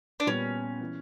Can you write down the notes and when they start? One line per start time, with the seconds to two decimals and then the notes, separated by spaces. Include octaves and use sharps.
0.20 D4
0.27 A#2 G3 B3 C#4
0.80 E3